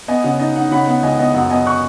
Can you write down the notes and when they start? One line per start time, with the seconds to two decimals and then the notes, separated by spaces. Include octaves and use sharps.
0.08 B3 D#5 G#5
0.24 C#3 F#5
0.39 D#4 D#5
0.56 D#4 F#5
0.71 C#3 F#5 B5
0.87 B3 F#5
1.03 C#2 D#5 G#5
1.19 B3 D#5
1.34 F#2 F#5
1.50 B3 D#5 G#5
1.66 C#6 F#6